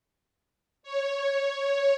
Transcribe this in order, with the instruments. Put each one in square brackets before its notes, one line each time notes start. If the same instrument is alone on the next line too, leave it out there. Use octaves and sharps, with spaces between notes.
[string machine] C#5